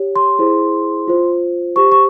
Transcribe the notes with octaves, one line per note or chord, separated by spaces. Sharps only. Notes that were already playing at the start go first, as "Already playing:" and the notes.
Already playing: G4 C#5
C6
E4 G#4 C5
F4 C5
G4 C5 C#6
C#6